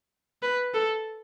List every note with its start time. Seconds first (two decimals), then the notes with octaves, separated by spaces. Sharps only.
0.43 B4
0.75 A4